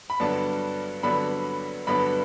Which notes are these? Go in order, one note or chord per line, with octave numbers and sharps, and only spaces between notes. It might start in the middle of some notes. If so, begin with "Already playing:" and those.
B5
G2 D3 F#3 B3 D4 A5
G2 D3 F#3 B3 D4 B5
G2 D3 F#3 B3 D4 B5